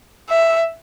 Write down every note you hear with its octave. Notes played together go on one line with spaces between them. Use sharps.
E5